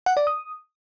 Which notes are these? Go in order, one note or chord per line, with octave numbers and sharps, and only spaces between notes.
F#5
D5
D#6